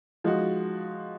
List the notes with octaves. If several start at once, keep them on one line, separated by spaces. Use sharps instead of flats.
F3 G#3 D#4 F#4